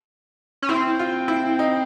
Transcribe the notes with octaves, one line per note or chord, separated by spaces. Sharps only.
C#4
C4 E4
F4
E4
D#4